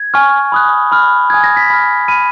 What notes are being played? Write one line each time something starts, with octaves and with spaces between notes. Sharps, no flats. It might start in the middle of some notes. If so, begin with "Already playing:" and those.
Already playing: G#6
G#5 C#6 F6
B5 D#6 F#6
B5 F6
G#5 D#6 F#6 G#6
A#6
B6
B5 F6
B5 F6 D#7